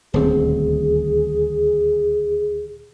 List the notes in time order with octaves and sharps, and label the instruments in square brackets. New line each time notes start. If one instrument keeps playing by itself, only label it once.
[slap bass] D#1 D2 C4 [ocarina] G#4